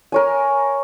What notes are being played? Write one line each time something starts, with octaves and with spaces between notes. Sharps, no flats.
A#4 C#5 G#5